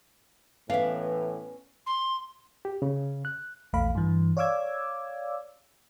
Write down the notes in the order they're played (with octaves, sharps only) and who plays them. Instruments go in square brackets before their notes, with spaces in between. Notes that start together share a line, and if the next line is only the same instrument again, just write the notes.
[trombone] A2 [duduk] E3 [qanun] B3 C#4 D5 [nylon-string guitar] E5 F5
[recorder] C6
[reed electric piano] G4
C#3
F#6
[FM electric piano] A#1 E2 A3 F5 B5
G2 E3
C#5 D5 F5 D6 E6 G#6